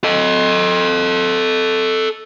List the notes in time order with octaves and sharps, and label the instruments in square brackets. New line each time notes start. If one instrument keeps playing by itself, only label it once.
[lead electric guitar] A4 D#5